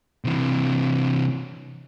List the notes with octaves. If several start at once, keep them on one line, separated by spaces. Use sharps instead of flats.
C3 E3